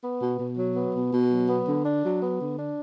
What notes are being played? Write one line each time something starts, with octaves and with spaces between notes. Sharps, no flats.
B3
B2
B2
F#3
B3
B2
B2
F#3
B3
D3
D4
F#3
B3
D3
D4